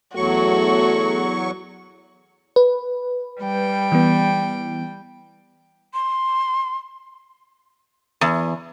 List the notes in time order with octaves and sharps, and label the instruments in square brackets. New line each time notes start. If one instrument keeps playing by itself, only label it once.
[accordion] E2 F#3 C#6 [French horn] A3 [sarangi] F#4
[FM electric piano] B4
[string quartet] G3 G5
[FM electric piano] E3 B3
[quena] C6
[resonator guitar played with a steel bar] E2